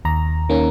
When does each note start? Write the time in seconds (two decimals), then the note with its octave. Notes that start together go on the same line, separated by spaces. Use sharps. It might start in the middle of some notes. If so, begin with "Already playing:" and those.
0.05 D#2 A#5
0.49 D#3 A#3 C#4